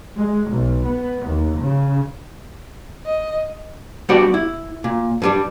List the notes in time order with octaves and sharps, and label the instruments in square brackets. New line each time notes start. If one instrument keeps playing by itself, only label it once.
[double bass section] G#3
B1
B3
D#2
C#3
[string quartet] D#5
[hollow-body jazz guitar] G3 B3 D4 F#4 G4 D5
E4
A#2
G2 G3 D4